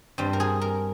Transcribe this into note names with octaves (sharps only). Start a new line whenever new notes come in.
G2 G3 C4
A#4
G#4
A#4